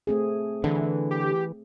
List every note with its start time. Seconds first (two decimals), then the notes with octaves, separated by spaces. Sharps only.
0.07 A3 C4 G#4
0.64 D3 E3
1.11 G4